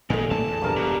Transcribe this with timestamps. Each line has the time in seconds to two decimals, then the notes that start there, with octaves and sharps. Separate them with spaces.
0.10 D#1 G#1 A#2 G#3 D#4 A4 G#5
0.31 A#2 A3 A#3 A5
0.48 E2 G2
0.62 A#1 E2 G2 C3 A#4
0.76 E1 B2